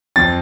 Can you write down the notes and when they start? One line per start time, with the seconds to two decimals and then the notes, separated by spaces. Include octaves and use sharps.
0.16 F2 A6